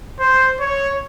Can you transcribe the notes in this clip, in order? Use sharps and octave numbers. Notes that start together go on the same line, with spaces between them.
C5
C#5